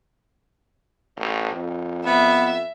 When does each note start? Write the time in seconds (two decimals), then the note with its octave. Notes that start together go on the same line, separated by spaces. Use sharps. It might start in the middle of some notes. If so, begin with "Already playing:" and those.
1.17 A1
1.52 F2
2.06 B3 E5